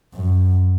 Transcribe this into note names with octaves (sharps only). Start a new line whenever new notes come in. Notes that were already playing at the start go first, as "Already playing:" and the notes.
F#2